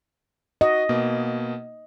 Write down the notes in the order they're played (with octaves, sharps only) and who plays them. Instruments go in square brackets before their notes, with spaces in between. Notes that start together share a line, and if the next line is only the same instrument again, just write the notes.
[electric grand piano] F#4 [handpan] D#5
[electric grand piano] B2 A#3